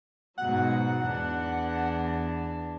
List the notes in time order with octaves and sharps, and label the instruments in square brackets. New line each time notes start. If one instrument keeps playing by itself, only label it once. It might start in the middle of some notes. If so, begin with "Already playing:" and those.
[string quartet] G#2 B2 F#3 [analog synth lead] F#5
[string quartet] E2 E3 D4